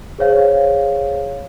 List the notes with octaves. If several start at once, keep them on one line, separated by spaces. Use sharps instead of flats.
G#4 C5 C#5 F5